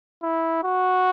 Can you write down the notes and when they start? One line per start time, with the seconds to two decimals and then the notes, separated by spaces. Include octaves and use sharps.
0.23 E4
0.64 F#4